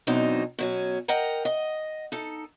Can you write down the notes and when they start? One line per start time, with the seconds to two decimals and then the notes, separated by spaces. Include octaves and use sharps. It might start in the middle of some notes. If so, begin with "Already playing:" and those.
0.07 F#2 B2 E3 C4 D4 D#4
0.59 B2 F#3 C#4
1.08 A#4 D#5 F#5 G5 A#5
1.45 D#5
2.12 D#4 A4